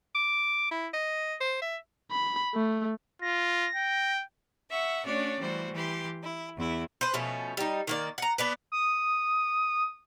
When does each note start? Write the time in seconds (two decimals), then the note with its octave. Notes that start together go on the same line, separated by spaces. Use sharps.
0.15 D6
0.71 E4
0.93 D#5
1.40 C5
1.61 E5
2.11 B5
2.54 A3
3.22 F4 A#6
3.75 G5
4.70 E5 F#5 C#6
5.04 A3 C#4 D4 F#4 C#5 D5
5.39 E3 G3 A3 F#4 C5
5.73 E3 G4 C6
6.22 E4
6.56 E2 E4
7.01 B4 C5
7.14 B2 F3 A3 C#4
7.57 G3 D#4
7.87 D#3 A#3 D5
8.18 F#5 A#5
8.38 B3 D4 B4
8.72 D#6